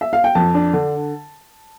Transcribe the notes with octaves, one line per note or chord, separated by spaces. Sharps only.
E5
F5
G5
F2 A5
D4
D3